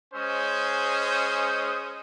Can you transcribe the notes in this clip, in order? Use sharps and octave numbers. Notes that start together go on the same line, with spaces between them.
G#3 C#4 C5 D#6